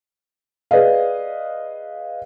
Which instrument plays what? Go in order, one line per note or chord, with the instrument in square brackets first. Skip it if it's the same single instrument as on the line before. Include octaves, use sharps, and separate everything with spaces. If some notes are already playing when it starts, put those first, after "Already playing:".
[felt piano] G#4 B4 D5 D#5 F5